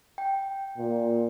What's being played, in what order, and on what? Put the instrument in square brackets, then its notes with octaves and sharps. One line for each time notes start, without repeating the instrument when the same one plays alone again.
[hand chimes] G5
[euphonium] A#2